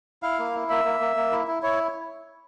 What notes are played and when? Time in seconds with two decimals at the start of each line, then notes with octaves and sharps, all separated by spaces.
0.23 E4 F5
0.39 A#3
0.54 E4
0.69 A#3 E5
0.85 A#3
1.01 A#3
1.16 A#3
1.32 E4
1.47 E4
1.63 E4 C#5